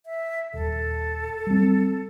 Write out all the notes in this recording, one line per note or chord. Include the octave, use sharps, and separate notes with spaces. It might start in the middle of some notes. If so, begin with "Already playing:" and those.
E5
D#1 A4
G3 C4